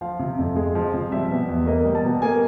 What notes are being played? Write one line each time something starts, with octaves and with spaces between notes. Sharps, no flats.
F3 F5
C3
F2
G#3
F3
C3
G3 E5
B2
E2
A#3 D#5
G3
A5
B2
A#3 G#5